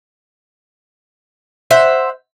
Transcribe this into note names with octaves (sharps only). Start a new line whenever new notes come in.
C5 E5 F#5